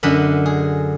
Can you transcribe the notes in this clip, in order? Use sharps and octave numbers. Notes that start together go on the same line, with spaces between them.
F#2 D3 D#5 B5
G#4